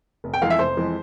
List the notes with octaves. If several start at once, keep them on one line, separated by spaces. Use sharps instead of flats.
F1
G5
F2 E3 G#3 F5
E5
F1 C5
F2 E3 G#3